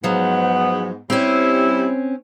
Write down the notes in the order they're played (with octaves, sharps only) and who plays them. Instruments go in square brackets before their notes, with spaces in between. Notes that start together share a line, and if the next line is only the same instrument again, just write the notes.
[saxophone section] G#2 B3 [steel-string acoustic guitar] F3 F#3
[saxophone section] G3 E4 [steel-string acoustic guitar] C4 C#4